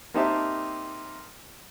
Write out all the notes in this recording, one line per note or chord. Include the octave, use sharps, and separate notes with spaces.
A#3 C4 D#4 G4 E5 A5